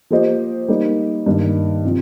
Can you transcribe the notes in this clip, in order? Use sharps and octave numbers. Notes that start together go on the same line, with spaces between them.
F3 A#3 G4 C5 D#5
G3 A#3 D#4 A#4
G2 D#3 A#3 D#4
C3 F3